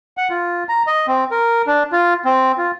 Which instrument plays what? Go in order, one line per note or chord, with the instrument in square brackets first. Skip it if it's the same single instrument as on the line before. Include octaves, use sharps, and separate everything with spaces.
[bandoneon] F#5
F4
A#5
D#5
C4
A#4
D4
F4
C4
F4